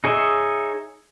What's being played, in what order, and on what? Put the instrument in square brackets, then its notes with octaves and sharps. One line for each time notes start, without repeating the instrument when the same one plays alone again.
[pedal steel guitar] D#4 G#4 C#5 D#5 E5